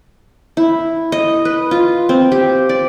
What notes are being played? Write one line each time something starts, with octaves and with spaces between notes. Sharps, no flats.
E4
D#5
B4
F4
C4
G4
D5